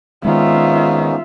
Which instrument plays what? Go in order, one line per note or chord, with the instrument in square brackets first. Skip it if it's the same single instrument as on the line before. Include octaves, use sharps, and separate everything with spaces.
[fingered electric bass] D#3 G#3 [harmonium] B3 C#4 D#4 [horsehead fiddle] F4 E5